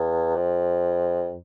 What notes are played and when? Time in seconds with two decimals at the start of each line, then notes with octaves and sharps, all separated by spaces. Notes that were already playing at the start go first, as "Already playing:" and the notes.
Already playing: E2
0.36 F2